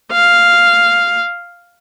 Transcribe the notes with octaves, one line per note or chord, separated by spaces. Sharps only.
F5